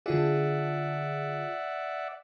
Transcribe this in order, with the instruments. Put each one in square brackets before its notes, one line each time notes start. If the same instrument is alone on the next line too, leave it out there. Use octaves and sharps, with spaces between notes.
[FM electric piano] D3 F4 G#4 [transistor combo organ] D5 E5 F#5